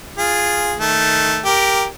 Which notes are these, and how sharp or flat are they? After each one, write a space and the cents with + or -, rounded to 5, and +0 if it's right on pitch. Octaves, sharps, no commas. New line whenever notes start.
F4 +0 G#4 -5
D#3 +0 A3 +0
G4 +0 A#4 +0